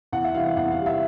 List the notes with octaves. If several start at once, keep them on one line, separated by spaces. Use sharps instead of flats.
E2 F#5
E5
C3 E3 G3 F5
E2 F#5
F5
C3 E3 G3
E5